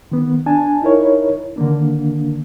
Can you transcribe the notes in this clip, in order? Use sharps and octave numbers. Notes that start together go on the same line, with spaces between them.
D#3 B3
D4 G#5 A5
D#4 E4 A#4 C#5
D3 D#3 A#3 D4